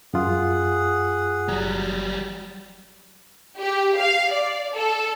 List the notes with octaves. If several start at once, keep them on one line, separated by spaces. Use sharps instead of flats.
F#2 F4 G#4 F#5
F#1 F#3 G3
G4
F5
D5
A4